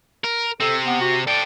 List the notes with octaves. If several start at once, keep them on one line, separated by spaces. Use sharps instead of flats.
A#4
C3 C4 A4
B3
F#4
A4 D5 G5